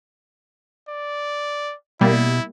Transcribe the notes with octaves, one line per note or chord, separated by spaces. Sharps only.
D5
B2 G3 A#3 E4